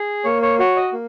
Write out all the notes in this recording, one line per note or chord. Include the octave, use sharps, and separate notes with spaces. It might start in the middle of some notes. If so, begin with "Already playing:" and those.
Already playing: G#4
A#3 C#5
C#5
F#4 C#5
D#5
A#3